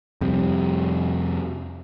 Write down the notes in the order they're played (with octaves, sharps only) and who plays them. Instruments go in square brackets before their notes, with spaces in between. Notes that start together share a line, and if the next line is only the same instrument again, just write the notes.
[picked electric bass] F2 C3 G3